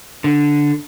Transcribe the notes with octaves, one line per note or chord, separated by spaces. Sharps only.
D3